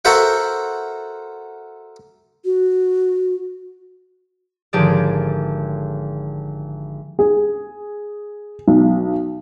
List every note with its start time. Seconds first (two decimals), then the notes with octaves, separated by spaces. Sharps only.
0.05 F#4 A4 A#4 C5 E5 F#5
2.45 F#4
4.73 G#1 D3 F3 G4 G#4 D5
7.19 G#4
8.68 B1